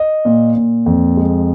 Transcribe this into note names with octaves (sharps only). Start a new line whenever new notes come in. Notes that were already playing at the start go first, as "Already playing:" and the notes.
Already playing: D#5
A#2
A#2
F2
G#3